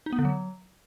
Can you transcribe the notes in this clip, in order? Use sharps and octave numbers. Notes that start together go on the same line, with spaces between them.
D#4
B3
D3
F#3